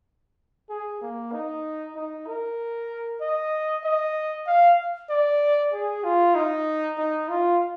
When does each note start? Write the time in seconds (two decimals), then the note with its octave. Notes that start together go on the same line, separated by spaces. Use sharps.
0.69 G#4
1.01 A#3
1.32 D#4
1.95 D#4
2.27 A#4
3.21 D#5
3.84 D#5
4.46 F5
5.09 D5
5.73 G#4
6.04 F4
6.35 D#4
6.98 D#4
7.29 F4